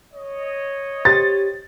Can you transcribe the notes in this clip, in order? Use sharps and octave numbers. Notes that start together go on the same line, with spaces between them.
C#5 D#5
G4 C5 A6